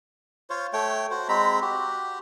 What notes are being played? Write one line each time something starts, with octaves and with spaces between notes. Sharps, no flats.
F4 C5 C#5
A3 C#5 G5
F#4 C5
G#3 C4 A#5 B5
F#4 G4